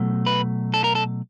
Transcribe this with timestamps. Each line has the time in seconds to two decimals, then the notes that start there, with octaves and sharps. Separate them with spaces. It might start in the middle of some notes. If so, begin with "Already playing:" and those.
Already playing: B2 F#3 A3
0.26 B4
0.74 A4
0.84 A#4
0.95 A4